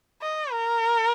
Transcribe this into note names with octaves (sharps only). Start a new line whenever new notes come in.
D#5
A#4